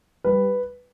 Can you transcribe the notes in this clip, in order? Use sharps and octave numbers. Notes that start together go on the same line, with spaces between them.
G3 B4